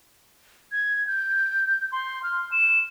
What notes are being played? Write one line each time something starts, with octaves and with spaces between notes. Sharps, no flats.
G#6
G6
C6
F6
E7